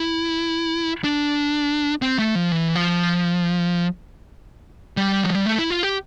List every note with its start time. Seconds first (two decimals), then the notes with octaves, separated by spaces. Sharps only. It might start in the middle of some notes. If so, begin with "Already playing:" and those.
Already playing: E4
1.04 D4
2.02 C4
2.19 A3
2.35 F3
2.52 E3
2.75 F3
4.97 G3
5.24 F3
5.35 G3
5.46 A3
5.59 E4
5.70 F4
5.83 G4